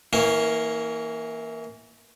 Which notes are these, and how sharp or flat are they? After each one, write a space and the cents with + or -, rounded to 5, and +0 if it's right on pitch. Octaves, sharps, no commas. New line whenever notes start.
E3 -25 A#3 +0 C#4 +0